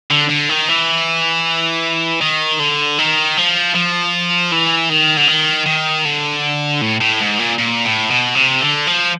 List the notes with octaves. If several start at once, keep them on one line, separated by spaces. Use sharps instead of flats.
D3
D3
D#3
E3
D#3
D3
D#3
F3
F3
E3
D#3
D3
D#3
D#3
D3
A2
A2
G#2
A#2
A#2
A2
B2
C3
D3
F3